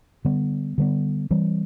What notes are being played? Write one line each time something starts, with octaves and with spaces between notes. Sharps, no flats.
D3 G3 B3
D3 G3 B3
E3 G3 C4